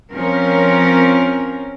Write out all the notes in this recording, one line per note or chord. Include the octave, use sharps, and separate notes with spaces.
F3 C4 C#4 A#4